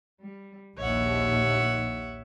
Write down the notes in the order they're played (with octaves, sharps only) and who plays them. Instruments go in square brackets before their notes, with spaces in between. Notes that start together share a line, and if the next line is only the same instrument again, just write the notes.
[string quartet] G3
[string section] A#1 D#2 [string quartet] C#5 E5 F#5